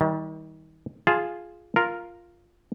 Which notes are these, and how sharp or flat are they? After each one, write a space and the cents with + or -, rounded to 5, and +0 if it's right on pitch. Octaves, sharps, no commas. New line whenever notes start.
D#3 +35 G3 +0
F4 +0 G#4 +0 A5 -20
F4 +0 A#4 -5